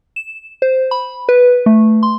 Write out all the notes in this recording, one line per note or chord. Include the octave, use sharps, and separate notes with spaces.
E7
C5
B5
B4
A3
C6